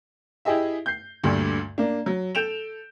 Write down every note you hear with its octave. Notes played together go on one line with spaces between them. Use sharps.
E4 G4 G#4 D#5 E5
G6 C7
D2 G2 A#2 D3
A#3 D4
F#3
A4 G6 D7 E7 F7